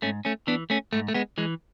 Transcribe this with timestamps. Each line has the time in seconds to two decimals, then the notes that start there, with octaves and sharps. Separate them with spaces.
0.02 G#2 A3 C#4
0.25 A3 C#4
0.47 E3 B3 D4
0.70 A3 C#4
0.93 G#2 A3
1.08 A3
1.14 G#3 B3
1.38 E3 G#3